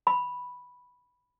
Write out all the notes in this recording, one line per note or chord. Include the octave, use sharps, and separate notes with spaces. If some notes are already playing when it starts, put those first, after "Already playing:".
B5